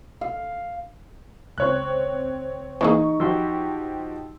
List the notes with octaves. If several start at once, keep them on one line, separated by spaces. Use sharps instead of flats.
F5
C#2 C4 C5 C#5 F#6
E3 A#3 D#4 G#4 C#6
F3 F#4 G4 C6 E6